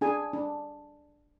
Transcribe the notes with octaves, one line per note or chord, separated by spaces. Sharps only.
D4 G#4 G#5
D4